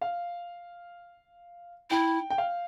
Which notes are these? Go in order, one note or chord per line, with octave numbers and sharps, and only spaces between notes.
F5
E4 G5
G5
F5